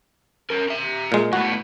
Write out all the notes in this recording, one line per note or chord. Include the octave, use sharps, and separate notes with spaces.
C#4 A#4
E5 A#5
A#2 G#3
A2 B3 F#4